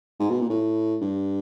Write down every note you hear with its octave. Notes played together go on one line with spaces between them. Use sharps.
G#2
B2
A#2
A2
G2